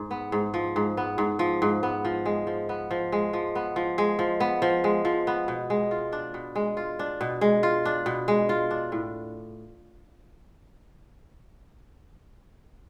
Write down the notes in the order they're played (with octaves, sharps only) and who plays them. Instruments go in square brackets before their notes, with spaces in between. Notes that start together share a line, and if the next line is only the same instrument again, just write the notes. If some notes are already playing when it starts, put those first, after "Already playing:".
Already playing: [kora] G#2
B3
G#2
F3
G#2
B3
G#2
F3
G#2
B3
F3
G#3
F3
B3
F3
G#3
F3
B3
F3
G#3
F3
B3
F3
G#3
F3
B3
B2
G#3
F4
D4
B2
G#3
F4
D4
B2
G#3
F4
D4
B2
G#3
F4
D4
A2